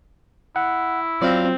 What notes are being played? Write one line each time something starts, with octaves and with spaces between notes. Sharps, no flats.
E4 F#5
F#3 C4 F4 D5 F5 A#5